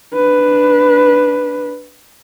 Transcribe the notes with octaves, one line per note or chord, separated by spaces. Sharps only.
D4 B4